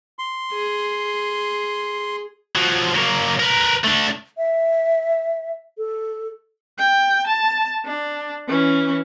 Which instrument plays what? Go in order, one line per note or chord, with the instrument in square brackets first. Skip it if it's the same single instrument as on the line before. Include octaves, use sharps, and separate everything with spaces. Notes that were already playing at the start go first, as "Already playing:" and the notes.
[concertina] C6
[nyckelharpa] G#4
[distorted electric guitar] F3 F#3
F#3 A#3
A#4 B4
A3 D4
[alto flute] E5
A4
[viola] G5
A5
D4
E3 C#4